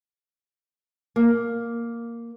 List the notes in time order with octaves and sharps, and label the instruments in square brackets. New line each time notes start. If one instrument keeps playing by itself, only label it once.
[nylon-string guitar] A#3